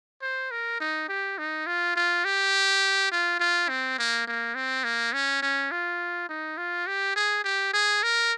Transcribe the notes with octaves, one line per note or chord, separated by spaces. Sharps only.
C5
A#4
D#4
G4
D#4
F4
F4
G4
F4
F4
C4
A#3
A#3
C4
A#3
C#4
C#4
F4
D#4
F4
G4
G#4
G4
G#4
A#4